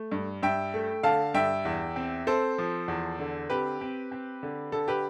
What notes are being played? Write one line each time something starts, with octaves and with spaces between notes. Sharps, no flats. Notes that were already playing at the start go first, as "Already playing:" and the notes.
Already playing: A3
G2
G2 E5 G5
A3
D3 F5 A5
G2 E5 G5
E2
C4
C4 A4 C5
F3
E2
D3
C4 G4 B4
C4
C4
D3
D3 A4
G4 B4